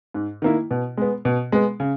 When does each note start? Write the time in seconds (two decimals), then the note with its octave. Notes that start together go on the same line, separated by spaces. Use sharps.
0.14 G#2
0.42 D#3 A#3 E4
0.71 B2
0.97 G#3 B3
1.25 B2
1.52 G#3 B3
1.80 C#3